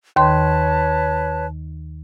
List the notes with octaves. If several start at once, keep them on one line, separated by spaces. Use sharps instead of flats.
D#2 D#3 B4 C#5 A5 C6